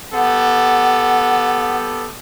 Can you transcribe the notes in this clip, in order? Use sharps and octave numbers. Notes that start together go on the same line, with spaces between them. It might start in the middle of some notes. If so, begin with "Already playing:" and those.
B3 G4 A4 F#5